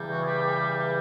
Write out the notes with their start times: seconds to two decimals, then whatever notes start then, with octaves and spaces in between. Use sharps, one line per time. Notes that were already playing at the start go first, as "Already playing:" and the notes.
Already playing: E2 C#3 E3 G3
0.10 F#4
0.22 G#4
0.27 G4